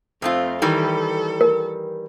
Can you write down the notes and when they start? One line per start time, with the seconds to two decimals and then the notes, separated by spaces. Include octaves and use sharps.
0.22 F2 A3 C4 F4
0.62 D#3 E3 G3 A4
1.41 A#4